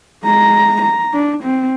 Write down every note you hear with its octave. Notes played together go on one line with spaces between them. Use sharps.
G#3 A#5
A#5
D4
C4